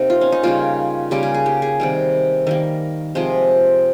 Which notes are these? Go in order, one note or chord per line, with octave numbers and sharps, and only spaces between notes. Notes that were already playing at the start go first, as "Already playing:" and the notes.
Already playing: C3 A#3 D#4
F4
C#4
D#4
C#3 G3 A#3 F4
C#3 G3 A#3 G4
G#4
G#4
G4
G#4
C3 D#3 G3
D#3 G3 A#3 A#4
C3 F3 G#3 C5